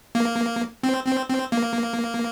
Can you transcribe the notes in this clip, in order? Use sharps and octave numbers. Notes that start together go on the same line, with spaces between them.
A#3
C4
C4
C4
A#3